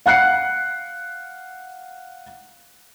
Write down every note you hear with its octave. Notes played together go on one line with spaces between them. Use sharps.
F5 F#5 F#6 C7 C#7